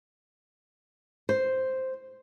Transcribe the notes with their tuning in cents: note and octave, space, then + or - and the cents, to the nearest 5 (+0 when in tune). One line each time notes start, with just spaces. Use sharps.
C5 +0